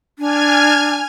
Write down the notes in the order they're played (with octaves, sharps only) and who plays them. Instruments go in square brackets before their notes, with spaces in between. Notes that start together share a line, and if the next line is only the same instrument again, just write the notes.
[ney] D4 [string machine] G#5 F6 G#6